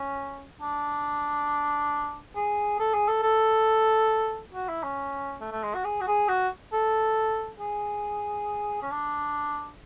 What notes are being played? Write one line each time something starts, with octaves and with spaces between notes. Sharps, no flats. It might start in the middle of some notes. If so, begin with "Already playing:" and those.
Already playing: C#4
D4
G#4
A4
G#4
A4
A4
F#4
E4
C#4
A3
A3
G#3
F#4
G#4
F#4
G#4
F#4
A4
G#4
C#4
D4